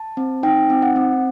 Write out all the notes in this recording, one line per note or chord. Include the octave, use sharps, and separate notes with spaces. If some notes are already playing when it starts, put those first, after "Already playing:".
Already playing: A5
C4
D#4 G5
C4
F#5
C4